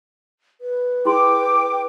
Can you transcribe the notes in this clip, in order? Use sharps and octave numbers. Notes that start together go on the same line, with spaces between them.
B4
E4 G#4 G5 C6 D6